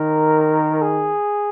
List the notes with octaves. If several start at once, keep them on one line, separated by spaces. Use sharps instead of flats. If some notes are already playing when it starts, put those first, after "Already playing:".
Already playing: D#3 A#4
G#4